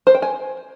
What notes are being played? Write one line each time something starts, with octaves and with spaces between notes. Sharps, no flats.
C5
G5
G#5